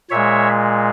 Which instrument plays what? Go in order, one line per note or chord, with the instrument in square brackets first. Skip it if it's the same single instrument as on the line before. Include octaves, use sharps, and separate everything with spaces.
[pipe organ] A#2 G#3 C#5 E5